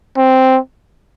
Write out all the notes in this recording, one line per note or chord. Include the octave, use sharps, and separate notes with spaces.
C4